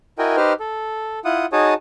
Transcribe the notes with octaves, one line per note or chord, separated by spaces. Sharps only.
E4 F#4 A#4 D#5 G5 G#5
D#4 G4 B4 C5 F6
A4
E4 F4 F#5 D#6
D#4 F#4 G#4 C#5 A5 D#6